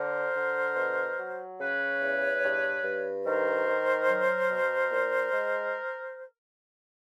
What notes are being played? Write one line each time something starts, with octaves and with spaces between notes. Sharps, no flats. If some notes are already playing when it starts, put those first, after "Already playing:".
Already playing: D3 A#4 C5
D3
B2
F#3
C#3 B4 C#5
E2
G2
G2
D#3 A#4 C5
D#3
F#3
B2
A#2
G#3